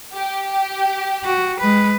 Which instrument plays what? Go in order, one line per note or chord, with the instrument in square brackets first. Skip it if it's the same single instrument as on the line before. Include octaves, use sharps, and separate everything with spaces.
[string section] G4
[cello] F#4
G#3 B4